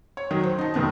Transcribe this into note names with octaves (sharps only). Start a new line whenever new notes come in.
C#5
D#3 F#3
C5
D#4 A5
F1 A2 D#3 B3 A5